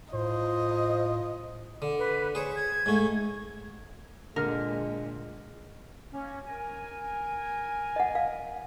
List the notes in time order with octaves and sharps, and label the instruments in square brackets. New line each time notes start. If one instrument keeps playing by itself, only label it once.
[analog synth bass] A2 [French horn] F4 [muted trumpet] C5 [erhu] D#5
[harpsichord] D3
[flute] B4
[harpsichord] G#4 C5 [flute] C#5
[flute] G#6
[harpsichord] G#2 A3
[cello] A#2 [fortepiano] D3 F6 [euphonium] G#3 [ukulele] A#4
[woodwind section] A#3 C#4
A#4 G#5
[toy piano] D#5 F#5
F5